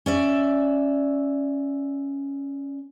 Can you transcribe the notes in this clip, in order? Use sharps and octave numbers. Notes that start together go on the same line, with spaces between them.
C#4 D5 E5